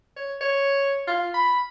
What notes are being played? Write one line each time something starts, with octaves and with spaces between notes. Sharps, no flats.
C#5
C#5
F4
B5